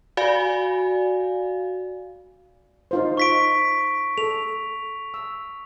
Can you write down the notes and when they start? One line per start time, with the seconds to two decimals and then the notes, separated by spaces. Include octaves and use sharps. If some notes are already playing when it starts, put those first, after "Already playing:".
0.17 F#4 D5 F5 G#5
2.91 D#4 F4 C5
3.17 C#6 B6 D7
4.18 A4 F7
5.14 E6